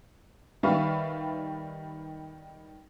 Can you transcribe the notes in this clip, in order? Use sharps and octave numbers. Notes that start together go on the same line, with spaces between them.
D#3 G3 B4 E5 F5 C#6